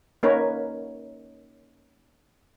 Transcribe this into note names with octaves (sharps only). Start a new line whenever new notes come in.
A#3 C#4 D#4 A#4 B4 C#5